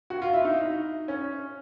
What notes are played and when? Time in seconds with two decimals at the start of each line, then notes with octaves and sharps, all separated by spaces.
0.10 F#4
0.22 F4
0.33 E4
0.45 D#4
1.08 C#4